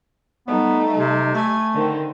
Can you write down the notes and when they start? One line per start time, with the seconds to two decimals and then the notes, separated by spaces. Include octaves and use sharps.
0.47 G3 A3 B3 D#4
0.97 C3
1.35 A3 G#5
1.73 D3 D#3 C4